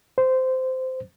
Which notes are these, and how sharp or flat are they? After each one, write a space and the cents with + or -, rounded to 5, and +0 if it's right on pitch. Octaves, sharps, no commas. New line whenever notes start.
C5 -15